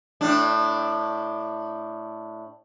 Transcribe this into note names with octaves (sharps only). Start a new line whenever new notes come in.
A2 D4